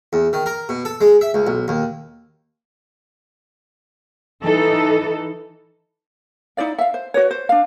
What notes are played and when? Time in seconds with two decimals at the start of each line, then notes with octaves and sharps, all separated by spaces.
0.13 E2
0.33 D#3
0.46 A#4
0.69 B2
0.85 A4
1.01 G#3
1.21 E5
1.34 C#2
1.47 B1
1.68 D#2
4.43 E3 D#4 A4
6.57 D#4 E4 D5 F5
6.78 E5 F5
6.94 C5
7.14 F#4 B4 C#5
7.31 C5
7.49 D4 F5